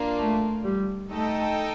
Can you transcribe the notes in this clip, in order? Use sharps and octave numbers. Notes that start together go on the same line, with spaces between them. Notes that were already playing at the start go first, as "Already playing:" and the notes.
Already playing: A#3 D4 F4
A3
G3
A3 D#4 A4 D#5 G5